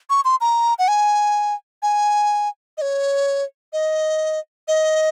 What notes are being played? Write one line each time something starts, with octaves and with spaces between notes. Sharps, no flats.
C#6
C6
A#5
F#5
G#5
G#5
D#5
C#5
D#5
D#5